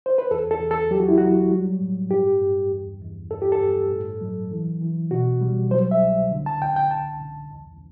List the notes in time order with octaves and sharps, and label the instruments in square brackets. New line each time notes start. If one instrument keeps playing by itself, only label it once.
[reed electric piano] C5
B4
E2 A4
A4
E2
A4
F#3 G4
F#4
E4
F#3 F#4
G3
A2
G2 G4
G2
E2
E2
G2 A4
G4
A4
G2
A2
F#3
E3
E3
B2 F#4
G3
F#3 C5
E5
C2
D3
A5
D2 G5
G5
C2 A5
C2
E2